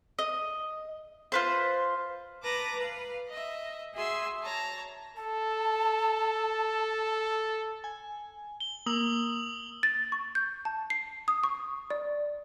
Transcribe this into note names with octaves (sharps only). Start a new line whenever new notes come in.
D#5
F4 B4 C5
B4 A5 A#5 D6 A#6
B4 F5
D#5 E5
F#4 G#4 E5 G#5 C6 E6
C#5 A5 A#5
A4 A5
G#5
G7
A#3 D#6 E6 F#7
A6
C#6
G6
A5
C7
D#6
C#6
D5